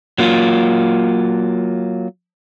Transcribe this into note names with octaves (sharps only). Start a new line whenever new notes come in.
F#3 A#3 F4